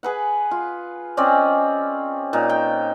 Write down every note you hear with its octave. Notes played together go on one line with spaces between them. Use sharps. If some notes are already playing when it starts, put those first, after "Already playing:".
G#4 B4 F#5
F4
C4 C#4 D5 D#5
A#2 D#4
G5